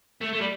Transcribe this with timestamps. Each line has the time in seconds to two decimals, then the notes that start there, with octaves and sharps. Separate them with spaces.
0.21 A3
0.33 A3
0.41 G3